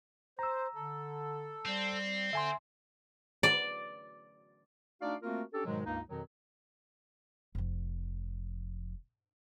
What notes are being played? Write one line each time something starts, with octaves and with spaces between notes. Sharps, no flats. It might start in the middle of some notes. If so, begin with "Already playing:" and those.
C5 A#5 E6
D3 A4
G3 C4
D3 E5 G#5 C6
D5
A3 D4 D#4 F#4 D5 F5
A3 A#3 C4 F4 F#4 A#4
C#4 D4 G4 A4
G#2 B2 D#3 F#3 G#3
C#2 G2 A#3 D#4
F2 B2 D#3 F#3
F1 F2